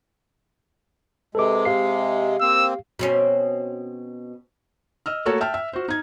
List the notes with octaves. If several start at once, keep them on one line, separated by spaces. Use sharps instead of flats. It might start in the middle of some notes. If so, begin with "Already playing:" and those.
C3 G#3 A4 B4 D6
G4 F5 C7
A#3 C4 E6
B2 C4 C#4
D#5 E6 F6
A3 A#3 F#4 A4 C#5
E5 G5 A5 F6
E5
F#4 C5
D#4 G#6